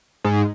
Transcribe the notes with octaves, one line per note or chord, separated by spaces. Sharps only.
G#2